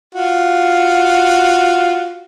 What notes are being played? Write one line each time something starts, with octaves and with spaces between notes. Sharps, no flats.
F4 F#4